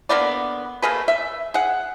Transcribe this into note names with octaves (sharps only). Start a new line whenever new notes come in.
D3 A#3 B3 D5
A3 A#3 G#4 B4
E5
G#4 F#5